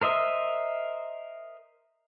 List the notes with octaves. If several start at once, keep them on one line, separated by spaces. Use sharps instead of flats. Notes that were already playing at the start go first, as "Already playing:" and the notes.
A#4 C5 D#5 E5